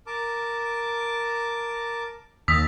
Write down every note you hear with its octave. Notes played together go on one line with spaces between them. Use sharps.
A#4 A5 D6
D#2 A5 D#6 E6 B6